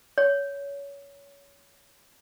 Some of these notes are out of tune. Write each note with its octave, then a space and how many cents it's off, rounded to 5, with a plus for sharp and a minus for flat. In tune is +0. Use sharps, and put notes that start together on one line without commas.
C#5 +20